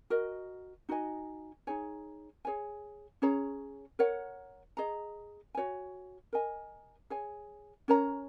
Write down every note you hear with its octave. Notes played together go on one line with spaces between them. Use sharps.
F#4 A#4 D#5
D#4 F#4 D#5 G#5
D#4 G#4 C#5 G#5
G#4 C#5 G#5
C#4 G#4 C#5 A#5
A#4 C#5 F#5
G#4 D#5 A#5
F#4 C#5 G#5
A#4 D#5 G#5
G#4 C#5 G#5
C#4 A#4 C#5 A#5